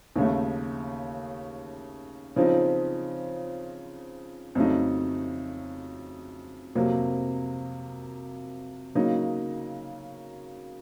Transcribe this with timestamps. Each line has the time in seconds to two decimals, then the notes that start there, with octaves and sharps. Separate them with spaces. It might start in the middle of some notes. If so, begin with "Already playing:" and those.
0.16 D#2 C#3 A3
2.36 C#3 F3 C4 D#4
4.55 F2 C#3 F#3 A3 D#4
6.75 F2 C3 F#3 A#3
8.95 C#3 F#3 A#3 D#4